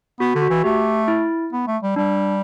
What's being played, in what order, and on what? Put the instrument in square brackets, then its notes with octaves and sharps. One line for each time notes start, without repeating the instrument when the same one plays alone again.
[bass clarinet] B3 [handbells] F#4
[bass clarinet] D3
[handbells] F#4
[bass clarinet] E3
[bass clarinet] A3 [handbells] G4
[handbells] E4
[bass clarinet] B3
A3
G3
[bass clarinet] G3 [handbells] D4